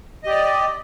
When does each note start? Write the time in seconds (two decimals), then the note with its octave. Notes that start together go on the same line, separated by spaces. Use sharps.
0.23 D#5
0.26 G4
0.29 D5